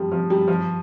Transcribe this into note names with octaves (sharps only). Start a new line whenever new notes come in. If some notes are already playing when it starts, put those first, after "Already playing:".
Already playing: F3 G3
F3
G3
F3